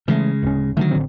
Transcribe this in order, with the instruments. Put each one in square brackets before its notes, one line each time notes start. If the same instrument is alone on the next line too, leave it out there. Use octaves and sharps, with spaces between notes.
[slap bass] C#3 G#3 [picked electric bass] E3 A3
[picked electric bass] D1 C#4
[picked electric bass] D3 A3 [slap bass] D#3 F#3
[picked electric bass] A1 D3 C4